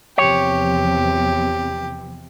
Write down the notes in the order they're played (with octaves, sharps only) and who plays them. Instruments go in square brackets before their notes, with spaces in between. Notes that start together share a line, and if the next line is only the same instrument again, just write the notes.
[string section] E2 C3 F3 [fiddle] G4 [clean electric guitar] C#5